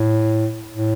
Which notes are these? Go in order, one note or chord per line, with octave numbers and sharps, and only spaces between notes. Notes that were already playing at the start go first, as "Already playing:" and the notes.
Already playing: A2
A2